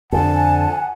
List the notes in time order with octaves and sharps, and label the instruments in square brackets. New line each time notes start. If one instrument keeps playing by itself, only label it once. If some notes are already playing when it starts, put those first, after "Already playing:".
[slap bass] F2 D3 [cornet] F#5 [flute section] G#5 [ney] A5